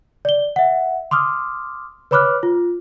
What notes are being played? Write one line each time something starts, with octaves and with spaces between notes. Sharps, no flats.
D5 G7
E5 F#5
C6 D6 D#6 F6
B4 C#5 B5 D6 F6 F#6
F4